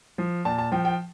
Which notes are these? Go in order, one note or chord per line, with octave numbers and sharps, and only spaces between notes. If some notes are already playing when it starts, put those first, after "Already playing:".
F3
A#2 A5
A5
F3 G5
G5